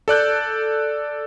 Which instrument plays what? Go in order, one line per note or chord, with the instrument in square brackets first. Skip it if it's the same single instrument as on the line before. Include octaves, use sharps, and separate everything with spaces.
[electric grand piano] A4 D5 F#6 G6